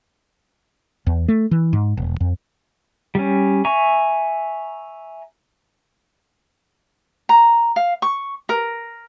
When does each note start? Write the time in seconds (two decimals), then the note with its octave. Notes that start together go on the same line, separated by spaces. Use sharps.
1.07 E2
1.28 A3
1.51 E3
1.73 G#2
1.97 E1
2.20 F2
3.15 G3 C#4
3.65 E5 G#5 A#5 C#6
7.29 A#5
7.76 F5
8.02 C#6
8.49 A#4